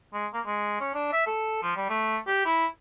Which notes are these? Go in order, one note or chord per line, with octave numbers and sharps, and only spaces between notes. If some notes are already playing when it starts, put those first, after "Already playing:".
G#3
A#3
G#3
C#4
D4
E5
A4
F3
G3
A3
G4
E4